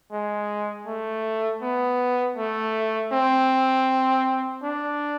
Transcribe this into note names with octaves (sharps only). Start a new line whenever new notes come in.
G#3
A3
B3
A3
C4
D4